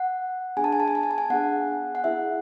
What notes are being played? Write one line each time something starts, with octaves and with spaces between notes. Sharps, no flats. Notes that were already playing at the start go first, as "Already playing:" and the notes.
Already playing: F#5
B3 D4 G#4 G#5
A5
G#5
A5
G#5
A5
G#5
A5
G#5
B3 D4 G#4 F#5
F#5
B3 E4 G#4 E5